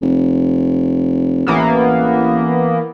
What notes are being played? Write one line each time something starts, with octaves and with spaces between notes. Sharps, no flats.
F1
A1 E3 A#3 B3